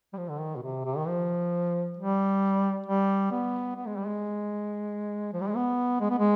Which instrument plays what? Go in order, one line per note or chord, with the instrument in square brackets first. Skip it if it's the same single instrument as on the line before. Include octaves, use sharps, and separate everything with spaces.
[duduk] G3
F3
D3
D#3
B2
C3
C3
D#3
F3
G3
G3
B3
B3
G#3
G3
G#3
F3
G3
G#3
B3
G#3
B3
G#3